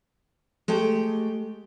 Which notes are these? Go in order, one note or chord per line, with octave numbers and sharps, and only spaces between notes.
G#3 A3 G4 G5